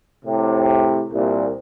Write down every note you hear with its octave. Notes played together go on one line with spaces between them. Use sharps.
A2 C3
C2 A#2